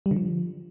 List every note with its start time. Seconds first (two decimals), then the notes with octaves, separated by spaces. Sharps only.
0.06 G3
0.11 D3
0.17 F3